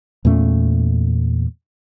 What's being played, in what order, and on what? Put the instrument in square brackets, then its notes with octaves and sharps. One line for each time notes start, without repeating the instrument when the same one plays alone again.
[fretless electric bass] E2 A#2 A3 C#4